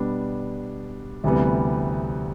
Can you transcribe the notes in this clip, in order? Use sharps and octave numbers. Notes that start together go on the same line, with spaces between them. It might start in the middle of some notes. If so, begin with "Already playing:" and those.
Already playing: B2 G3 B3 D4
D2 C3 E3 G3 B3